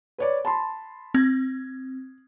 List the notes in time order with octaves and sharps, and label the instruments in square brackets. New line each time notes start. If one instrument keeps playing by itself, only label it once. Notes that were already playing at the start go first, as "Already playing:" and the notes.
[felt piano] B4 C#5 D5
A5 B5 C6
[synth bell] C4 [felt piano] G#6